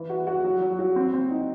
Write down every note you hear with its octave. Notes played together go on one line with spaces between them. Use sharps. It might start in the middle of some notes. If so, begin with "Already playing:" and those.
Already playing: E3
F#4
F#4
F#3
F#3
F#3
C4
C4
D#4